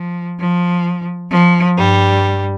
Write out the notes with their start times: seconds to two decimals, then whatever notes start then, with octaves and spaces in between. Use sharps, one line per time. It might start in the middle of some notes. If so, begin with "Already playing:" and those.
Already playing: F3
0.39 F3
1.31 F3
1.77 G2 G3